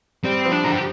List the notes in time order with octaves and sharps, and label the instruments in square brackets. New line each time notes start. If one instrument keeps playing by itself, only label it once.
[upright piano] G3 [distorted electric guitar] C4
[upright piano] F3
[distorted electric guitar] D4
[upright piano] D3 [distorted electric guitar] A#4
[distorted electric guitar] G4